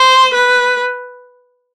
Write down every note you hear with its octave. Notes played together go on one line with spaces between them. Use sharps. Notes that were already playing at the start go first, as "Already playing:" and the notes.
Already playing: C5
B4